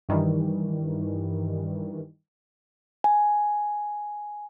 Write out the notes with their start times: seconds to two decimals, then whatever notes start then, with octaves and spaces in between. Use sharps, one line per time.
0.09 G2 D#3 E3 G3
3.04 G#5